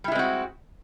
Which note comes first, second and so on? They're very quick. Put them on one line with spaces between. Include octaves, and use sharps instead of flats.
G3 E4 G#3 C4 F#4